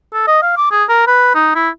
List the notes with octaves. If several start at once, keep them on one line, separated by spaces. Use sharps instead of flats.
A4
D#5
F5
D6
G#4
A#4
B4
D#4
E4